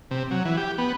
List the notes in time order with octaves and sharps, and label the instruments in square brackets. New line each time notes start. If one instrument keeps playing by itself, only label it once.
[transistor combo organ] C3
F#3
E3
G4
B3